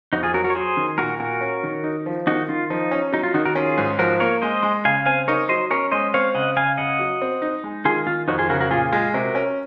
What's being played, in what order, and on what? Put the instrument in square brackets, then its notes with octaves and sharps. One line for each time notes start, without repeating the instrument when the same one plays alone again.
[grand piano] F2 [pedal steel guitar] D#4 F#4
[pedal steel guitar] F4 G#4
[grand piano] F#3 [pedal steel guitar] F#4 A#4
[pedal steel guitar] F#4 A#4
C#5
[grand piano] F#3 [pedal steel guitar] G#4 C5
[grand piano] D#3
[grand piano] A#2 [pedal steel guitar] F#4 A#4
[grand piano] A#2 [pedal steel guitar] F#4 A#4
[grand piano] C#4
D#3
D#4
F3
[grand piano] D#3 [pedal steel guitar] D#4 F#4
[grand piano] D#3 [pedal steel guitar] F4
[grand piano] F3 [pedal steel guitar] D#4
[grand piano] C#4
[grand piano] F#3 [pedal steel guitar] D#4
[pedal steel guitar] F4
[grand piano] D#3 [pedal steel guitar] D#4 F#4
[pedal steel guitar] F#4 A#4
[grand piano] C#4 [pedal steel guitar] F4 G#4
[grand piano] G#2
[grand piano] F3 [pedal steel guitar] F#4 A#4
[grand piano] A#3 [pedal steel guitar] A#4 C#5
[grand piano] G#3 [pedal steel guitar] C5 D#5
[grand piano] G#3
[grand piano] C#3 [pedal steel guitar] F5 G#5
[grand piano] C4 [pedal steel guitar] F5 G#5
[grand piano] D#4 [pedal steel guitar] A#4 C#5
[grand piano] F#3 [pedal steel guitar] C5 D#5
[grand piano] C#4 [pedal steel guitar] A#4 C#5
[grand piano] G#3 [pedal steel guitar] C5 D#5
[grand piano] C4 [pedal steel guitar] C#5 F5
[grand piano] C#3 [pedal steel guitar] D#5 F#5
[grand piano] C#3 [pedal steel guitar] F5 G#5
[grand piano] C#3 [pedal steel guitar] D#5 F#5
[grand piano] F#3
C4
D#4
G#3
[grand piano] D#3 [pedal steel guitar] F4 G#4
[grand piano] D#3 [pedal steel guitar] F4
[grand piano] F2 [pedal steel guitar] D#4 F#4
[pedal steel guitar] F4 G#4
[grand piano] C#3 [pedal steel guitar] F#4 A#4
[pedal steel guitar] F#4 A#4
[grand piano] A#2 [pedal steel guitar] F4 G#4
[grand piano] G#3 [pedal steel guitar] F4 G#4
[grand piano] C3 [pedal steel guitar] F#4 A#4
[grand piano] C#4